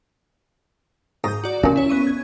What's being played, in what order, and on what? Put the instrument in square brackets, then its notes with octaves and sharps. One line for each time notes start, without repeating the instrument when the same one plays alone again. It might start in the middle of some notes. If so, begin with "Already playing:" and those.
[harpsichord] G#2 [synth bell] A#5 D#6 G6
[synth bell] F#4 D5
[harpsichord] C#2 A#2 [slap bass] C#4
[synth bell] E4 C#5
B3 C#6 D#7
G#6